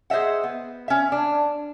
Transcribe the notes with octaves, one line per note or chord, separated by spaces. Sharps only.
G#4 C5 D#5 E5 F#5
B3
C#4 E5
D4